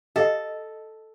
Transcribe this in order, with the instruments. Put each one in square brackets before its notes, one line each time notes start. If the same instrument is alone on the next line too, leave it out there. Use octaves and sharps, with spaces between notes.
[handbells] G4 F5 [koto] A4 [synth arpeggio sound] D#5